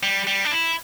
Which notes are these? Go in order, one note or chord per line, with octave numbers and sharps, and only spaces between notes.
G3
G3
D4
E4